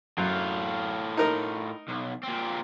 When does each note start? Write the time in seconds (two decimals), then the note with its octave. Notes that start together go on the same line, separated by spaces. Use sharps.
0.18 F#2 A2 F4
1.17 D#4 A#4 D#5
1.89 B1
2.24 A#2 C4